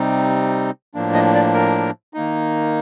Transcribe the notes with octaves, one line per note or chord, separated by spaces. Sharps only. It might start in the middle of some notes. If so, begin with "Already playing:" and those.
Already playing: C3 G3 C4 D#4
A2 F3 A#3 D4
D#5
D5
A#4
D#3 A#3 D#4